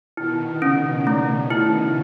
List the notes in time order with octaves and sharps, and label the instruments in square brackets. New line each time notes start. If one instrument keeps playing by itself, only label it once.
[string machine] B2 D#3 [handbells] E4
[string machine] C#3 [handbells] C#4
[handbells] A3
E4